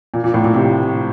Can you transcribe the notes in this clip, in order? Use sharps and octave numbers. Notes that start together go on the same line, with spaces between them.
A#2
A#2
A2
A#2
C3